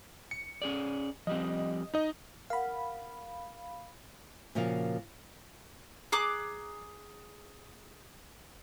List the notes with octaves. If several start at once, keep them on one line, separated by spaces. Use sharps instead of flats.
C#7
C#4 G#4 D5
F3 G3 C4 D#5
D#4 D#5
A#4 F5 F#5 B5
A#2 C#3 F3 F#4 A#4 F5
G#4 A#5 D6 F#6